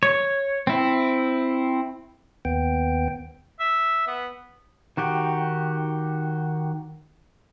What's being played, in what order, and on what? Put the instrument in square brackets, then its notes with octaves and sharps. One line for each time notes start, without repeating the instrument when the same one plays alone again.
[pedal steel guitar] C#5
C4 E4
[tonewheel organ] D#2 B3 G5
[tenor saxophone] E5
B3
[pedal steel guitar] D#3 F#4 G4